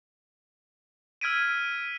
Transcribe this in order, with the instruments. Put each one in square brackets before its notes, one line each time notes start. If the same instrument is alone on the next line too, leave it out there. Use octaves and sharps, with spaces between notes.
[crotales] E6 F6 G#6 B6 D7 D#7